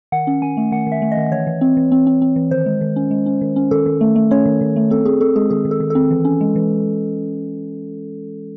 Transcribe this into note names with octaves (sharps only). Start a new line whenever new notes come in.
D#3 F#5
C#4
D#3 G#5
A3
D#3 F#5
D#3
E5
A3
D#5
D#3
E3 C#5
E3
C4
E3
C4
C4
C4
E3
D#3 C5
G#3
D#3
C#4
G#3
C#4
D#3
C#4
D#3 A4
D#3
A3
A3
C#4 C#5
D#3
D#3
A3
C4 A4
C4 G#4
C4 A4
G#3 G#4
D#3 G#4
D#3
A4
D#3
C4 A4
E3
C#4
G#3
E3